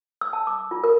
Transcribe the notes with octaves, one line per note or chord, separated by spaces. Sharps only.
E6
A5
D6
F4
A#4